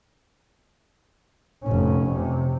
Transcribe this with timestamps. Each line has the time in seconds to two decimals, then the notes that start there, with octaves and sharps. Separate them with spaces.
1.64 F1 C#4
2.12 C3